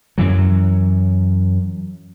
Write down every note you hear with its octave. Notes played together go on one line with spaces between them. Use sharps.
F#2 E3 F#3